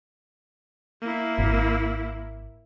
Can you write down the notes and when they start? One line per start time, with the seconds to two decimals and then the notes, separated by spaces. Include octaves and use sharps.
1.02 A#3 E4
1.38 G#1